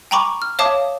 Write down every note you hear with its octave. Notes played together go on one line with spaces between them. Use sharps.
G5 G#5 A#5 B5 C#6 D6
F6
C#5 E5 F5 A5 D6 D#6